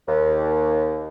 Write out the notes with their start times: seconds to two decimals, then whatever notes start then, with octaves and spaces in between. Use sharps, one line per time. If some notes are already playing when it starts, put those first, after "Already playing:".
0.08 D#2